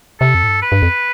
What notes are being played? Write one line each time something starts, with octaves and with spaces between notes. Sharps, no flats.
C3 A4
F2
A2
G2
B4
G2
F2